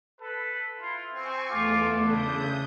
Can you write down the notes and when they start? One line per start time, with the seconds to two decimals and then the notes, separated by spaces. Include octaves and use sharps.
0.20 A4 B4
0.80 E4 F4
1.13 C4 G#5 C#6
1.49 E2 A3 F4 A4 D6
2.05 C#3 D4 E4 D#6 G6